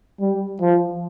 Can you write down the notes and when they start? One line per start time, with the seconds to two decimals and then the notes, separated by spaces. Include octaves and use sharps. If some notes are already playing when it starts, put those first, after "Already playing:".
0.21 G3
0.61 F3